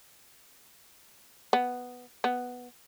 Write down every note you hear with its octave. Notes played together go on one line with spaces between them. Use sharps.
B3
B3